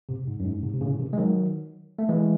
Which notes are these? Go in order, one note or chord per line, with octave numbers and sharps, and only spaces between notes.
G#2 C3
G#2
F#2
G#2
G#2 C3
C3
A2 C#3
C3 D#3
G#3
D#3 F#3
A3
E3 G#3